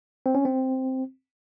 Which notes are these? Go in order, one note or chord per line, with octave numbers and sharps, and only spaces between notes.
C4
C#4
C4